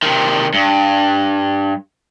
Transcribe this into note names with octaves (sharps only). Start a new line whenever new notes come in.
C3 D#3
G2